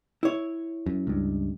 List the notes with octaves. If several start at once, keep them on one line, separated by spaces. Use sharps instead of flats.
E4 C#5
F#2
C#2 G2